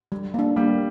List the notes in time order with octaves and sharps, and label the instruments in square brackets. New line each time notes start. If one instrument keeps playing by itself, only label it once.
[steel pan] G3
A#3 D4
[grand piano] G3 [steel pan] A#3